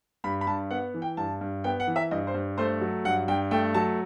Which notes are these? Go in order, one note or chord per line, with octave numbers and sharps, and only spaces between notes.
G2 B5
B5
G2 A5
B3 F#5
E3
G5
G2 A5
G2
B3 G5
F#5
E3
E5
G2 D#5
C5
G2
A3 C5
F#3
G2 F#5
G2 G5
A3 G5
F#3 A5